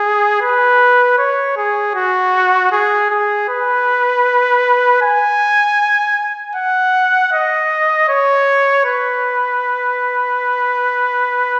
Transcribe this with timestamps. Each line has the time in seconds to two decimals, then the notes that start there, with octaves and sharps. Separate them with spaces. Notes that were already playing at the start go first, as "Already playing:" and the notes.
Already playing: G#4
0.42 B4
1.18 C#5
1.57 G#4
1.95 F#4
2.72 G#4
3.10 G#4
3.49 B4
5.02 G#5
6.55 F#5
7.33 D#5
8.09 C#5
8.85 B4